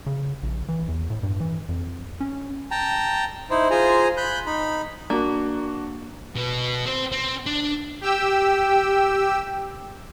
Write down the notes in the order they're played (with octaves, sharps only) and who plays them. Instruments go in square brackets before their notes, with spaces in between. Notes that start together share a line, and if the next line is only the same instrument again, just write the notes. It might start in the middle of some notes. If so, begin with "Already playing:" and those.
[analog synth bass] C#3
A#1
E3
E2
A2
G2
E3
F2
C#4
[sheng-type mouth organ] G5 A5 A#5
D#4 E4 C5
F4 G#4 C5 G#5 A#5
B5 F#6 G6
D#4 B5
[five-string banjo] A#3 [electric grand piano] D4 F#4
[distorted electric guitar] B2 B3
C4 C5
C4
D4
[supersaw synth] G4 G5 E6